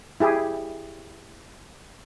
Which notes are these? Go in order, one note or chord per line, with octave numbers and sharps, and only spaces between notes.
E4 G4 G#4